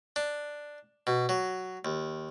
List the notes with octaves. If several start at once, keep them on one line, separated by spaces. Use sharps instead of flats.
D4
B2
F#3
D#2